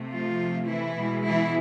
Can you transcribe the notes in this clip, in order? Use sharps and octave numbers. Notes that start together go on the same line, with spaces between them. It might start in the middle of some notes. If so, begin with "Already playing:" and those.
Already playing: C3 A3
F3 F4
E3 E4
B2 G#3
E3 E4